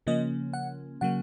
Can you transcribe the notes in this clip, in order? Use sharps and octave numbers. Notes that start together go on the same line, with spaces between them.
C#3 F3 A#3 C#4 D#5
F#5
C#3 F#3 A#3 F#5